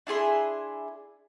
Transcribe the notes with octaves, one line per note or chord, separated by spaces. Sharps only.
D4 E4 G#4 C6